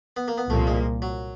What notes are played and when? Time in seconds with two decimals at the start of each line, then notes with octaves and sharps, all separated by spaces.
0.17 B3
0.28 A#3
0.38 B3
0.50 C2 A#2 F3 A3 A#3
0.67 G#3
1.02 F#3